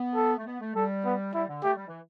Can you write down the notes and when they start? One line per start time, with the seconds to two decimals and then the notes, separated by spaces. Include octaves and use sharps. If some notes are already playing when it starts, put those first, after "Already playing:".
Already playing: B3
0.15 A4
0.37 A3
0.45 B3
0.60 A3
0.75 G3 A4
1.05 B3
1.34 G3 E4
1.49 D3
1.63 A3 G4
1.76 G3
1.88 E3